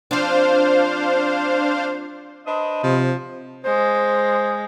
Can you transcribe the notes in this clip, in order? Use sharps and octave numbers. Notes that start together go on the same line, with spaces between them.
F3 C4 D4 C5 F5
D4 B4 C5 D#5
C3 F3
G#3 C5